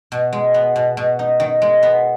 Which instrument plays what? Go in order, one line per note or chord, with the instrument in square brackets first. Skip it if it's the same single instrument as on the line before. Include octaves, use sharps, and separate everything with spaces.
[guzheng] B2
G#3
B3
B2
B2
D#4
D#3
G#3
B3